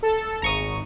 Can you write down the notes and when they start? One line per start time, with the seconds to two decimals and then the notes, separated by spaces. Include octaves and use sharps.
0.03 A4
0.42 G#1 A#5 C#6 D#6